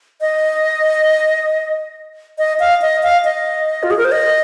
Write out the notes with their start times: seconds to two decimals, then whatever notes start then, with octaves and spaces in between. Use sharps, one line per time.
0.21 D#5
2.38 D#5
2.60 F5
2.82 D#5
3.03 F5
3.25 D#5
3.83 F4
3.91 G#4
3.98 A#4
4.05 C5
4.12 D#5